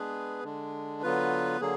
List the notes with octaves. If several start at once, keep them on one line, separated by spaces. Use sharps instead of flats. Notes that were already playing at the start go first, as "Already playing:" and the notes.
Already playing: G#3 B3 D4 G#4 B4
D3 G#3 D4
D3 F#3 B3 F4 B4
D3 F#3 A#3 G#4